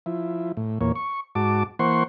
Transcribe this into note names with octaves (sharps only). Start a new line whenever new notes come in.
F3 E4
A2
E2 A#2 A#3 C#5
C#6
G#2 F#4 A5 D6
E3 A#3 C5 F#5 C6 C#6